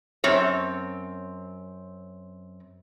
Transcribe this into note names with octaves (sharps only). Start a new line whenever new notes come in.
F#2 C4 C#5